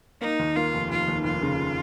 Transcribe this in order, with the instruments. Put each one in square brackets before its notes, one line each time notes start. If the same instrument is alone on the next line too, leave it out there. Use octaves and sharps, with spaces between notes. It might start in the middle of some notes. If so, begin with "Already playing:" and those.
[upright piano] A#3 [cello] D#4
[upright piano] D#2
[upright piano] A#3 [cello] F4
[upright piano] F1
[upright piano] F1 [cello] F4
[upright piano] D#2
[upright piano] F1 [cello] F4
[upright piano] C#3